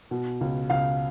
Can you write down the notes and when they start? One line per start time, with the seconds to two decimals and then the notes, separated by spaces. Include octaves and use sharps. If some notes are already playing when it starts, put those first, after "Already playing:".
0.11 B2
0.41 C#2
0.70 C#2 F5